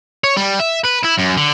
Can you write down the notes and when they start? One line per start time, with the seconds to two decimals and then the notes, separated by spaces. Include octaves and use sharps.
0.24 C#5
0.37 G3
0.60 E5
0.85 B4
1.05 E4
1.19 F#2
1.38 D3